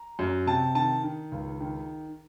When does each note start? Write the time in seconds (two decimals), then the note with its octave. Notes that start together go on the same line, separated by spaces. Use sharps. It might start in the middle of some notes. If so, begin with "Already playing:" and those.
Already playing: A#5
0.19 F#2
0.47 C3 A5
0.75 D#3 A5
1.04 D#3
1.32 C#2
1.60 D#3